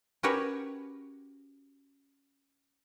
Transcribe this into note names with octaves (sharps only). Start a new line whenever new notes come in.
C#4 F#4 G4 A#4 B4 C#5